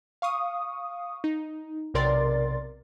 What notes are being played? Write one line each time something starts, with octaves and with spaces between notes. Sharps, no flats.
F5 C#6 D#6
D#4
B1 C3 A#4 D5 C6 A6